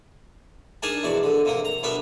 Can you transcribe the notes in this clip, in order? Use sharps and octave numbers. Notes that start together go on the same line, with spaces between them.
D4 D#4 G#4 A#4 G#5 A5
E2 B2 D5
D3
C3 A#3 A#4
A#5
B2 B3 D4 A#4 E5